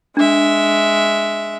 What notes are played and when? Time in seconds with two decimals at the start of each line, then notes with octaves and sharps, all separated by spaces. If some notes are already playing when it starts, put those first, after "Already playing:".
0.17 G#3 D4 E5